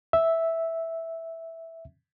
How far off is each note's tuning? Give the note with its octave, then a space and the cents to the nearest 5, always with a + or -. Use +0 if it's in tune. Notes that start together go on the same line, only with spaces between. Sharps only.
E5 -5